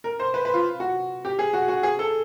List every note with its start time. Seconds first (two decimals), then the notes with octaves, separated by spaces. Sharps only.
0.04 A#4
0.20 C5
0.34 B4
0.45 B4
0.54 F4
0.80 F#4
1.25 G4
1.39 G#4
1.53 F#4
1.68 F#4
1.83 G#4
1.99 A4